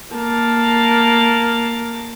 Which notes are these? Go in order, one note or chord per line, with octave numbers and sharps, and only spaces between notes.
A#3 A5